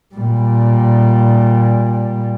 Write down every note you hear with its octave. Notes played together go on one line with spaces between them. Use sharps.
A#2 G3